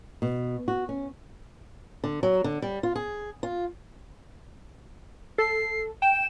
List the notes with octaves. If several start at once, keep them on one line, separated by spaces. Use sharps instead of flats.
B2
F#4
C#4
D3
F#3
D3
G3
F4
G#4
F4
A4 C7
G5 E7